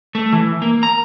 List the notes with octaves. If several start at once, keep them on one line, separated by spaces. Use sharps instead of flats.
A3
E3
A#3
A#5